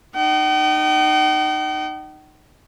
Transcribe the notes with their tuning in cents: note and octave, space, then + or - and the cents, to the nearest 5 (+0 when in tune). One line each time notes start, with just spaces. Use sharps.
D#4 -25 G5 -45